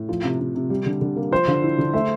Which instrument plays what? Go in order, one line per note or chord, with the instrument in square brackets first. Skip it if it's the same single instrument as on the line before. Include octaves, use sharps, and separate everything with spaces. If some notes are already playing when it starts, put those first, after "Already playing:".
Already playing: [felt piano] A2
F3
C3
C3
C3
G3
D3
D3
A#3
[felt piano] F3 [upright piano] C5
[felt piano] D3
E4
D3
[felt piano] A3 [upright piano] E5